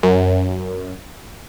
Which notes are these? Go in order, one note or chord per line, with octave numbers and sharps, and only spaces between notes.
F#2